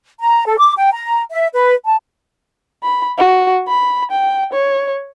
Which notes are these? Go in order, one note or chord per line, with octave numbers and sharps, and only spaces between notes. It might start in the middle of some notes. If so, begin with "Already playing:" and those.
A#5
A4
D6
G5
A#5
E5
B4
A5
B5
F#4
B5
G5
C#5